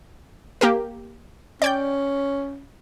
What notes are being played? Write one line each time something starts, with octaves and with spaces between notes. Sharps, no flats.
A#3 G4 A#4
C#4 D5 G5 G6